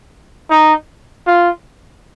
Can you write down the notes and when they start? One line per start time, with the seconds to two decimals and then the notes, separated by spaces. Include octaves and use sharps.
0.50 D#4
1.27 F4